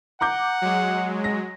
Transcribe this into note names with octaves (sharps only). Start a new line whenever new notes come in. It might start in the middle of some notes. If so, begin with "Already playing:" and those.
F#5 A#5 D6 G6
F#3 G#3
A#6